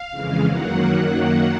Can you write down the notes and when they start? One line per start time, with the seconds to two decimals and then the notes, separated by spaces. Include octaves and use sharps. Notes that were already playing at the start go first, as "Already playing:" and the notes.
Already playing: F5
0.10 F2 C#3 E3 G#3
0.45 F#2 D#3 F#3 A#3 F#5